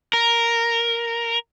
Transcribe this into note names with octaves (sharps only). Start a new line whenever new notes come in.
A#4